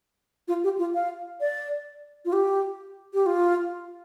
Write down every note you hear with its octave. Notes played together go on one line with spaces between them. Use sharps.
F4
G4
F4
F5
D5
F4
G4
G4
F4